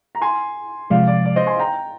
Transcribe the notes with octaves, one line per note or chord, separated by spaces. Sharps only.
A#5
G#5 C6
C3 F3 G#3 D5 F5
D5
D5
C5 D#5
G#5 C6
G5 A#5